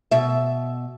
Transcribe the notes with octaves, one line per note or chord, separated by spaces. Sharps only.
B2 E5